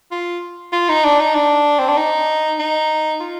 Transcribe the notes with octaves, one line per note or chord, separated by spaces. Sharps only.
F4
F4
D#4
D4
D#4
D4
C4
D4
D#4
D#4
F4